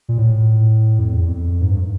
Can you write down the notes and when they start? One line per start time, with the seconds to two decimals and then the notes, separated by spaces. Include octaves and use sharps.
0.09 A#2
0.18 A2
0.99 F2
1.12 E2
1.26 F2
1.61 G#2
1.70 G2